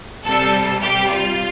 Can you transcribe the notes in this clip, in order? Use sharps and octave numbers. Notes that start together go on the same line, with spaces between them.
C3 G3 A4
C3 G3 G4
F4